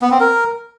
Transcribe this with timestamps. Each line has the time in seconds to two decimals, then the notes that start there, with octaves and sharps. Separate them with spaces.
0.02 B3
0.11 C4
0.20 A#4